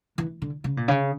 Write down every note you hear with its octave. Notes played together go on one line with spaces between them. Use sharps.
E3
D3
C#3
A#2
C#3